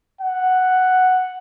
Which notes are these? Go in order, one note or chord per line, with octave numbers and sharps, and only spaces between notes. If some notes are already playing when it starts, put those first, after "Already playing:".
F#5